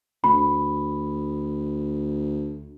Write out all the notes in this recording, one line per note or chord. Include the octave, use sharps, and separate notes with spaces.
D2 B5